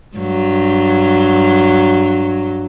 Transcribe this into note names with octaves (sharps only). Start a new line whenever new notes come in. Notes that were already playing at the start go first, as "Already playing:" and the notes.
G2 F#3